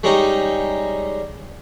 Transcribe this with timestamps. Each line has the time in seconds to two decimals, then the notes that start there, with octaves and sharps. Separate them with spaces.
0.04 G3 G#3 C#4 D#4 D#5